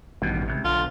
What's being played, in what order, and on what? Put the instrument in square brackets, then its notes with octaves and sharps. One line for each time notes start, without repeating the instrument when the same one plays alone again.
[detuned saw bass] A1 [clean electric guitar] G2 B2 D#3
[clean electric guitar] C#2 F#2 C3
[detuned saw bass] B1 [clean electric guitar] D3 [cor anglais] F4